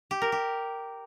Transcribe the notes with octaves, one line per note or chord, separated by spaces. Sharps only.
G4
A#4
G4